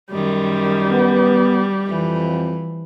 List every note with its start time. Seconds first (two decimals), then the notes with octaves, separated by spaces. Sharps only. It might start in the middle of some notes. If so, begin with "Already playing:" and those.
0.11 F#2 D#3 G3
0.90 B3
1.88 F2 E3